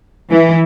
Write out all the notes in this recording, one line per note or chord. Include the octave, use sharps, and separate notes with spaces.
E3